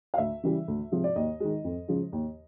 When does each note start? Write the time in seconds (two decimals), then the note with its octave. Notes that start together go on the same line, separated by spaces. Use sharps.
0.14 F5
0.18 D2 E5
0.43 C#3 E3 G3
0.68 D2
0.92 C3 F3 G#3
1.04 D5
1.16 D#2 D#5
1.40 D#3 G#3
1.64 F2
1.88 C#3 F3 G#3
2.12 D#2